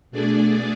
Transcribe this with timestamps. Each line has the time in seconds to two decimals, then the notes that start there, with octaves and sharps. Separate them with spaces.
0.11 B2 A3 D4 G#4 D5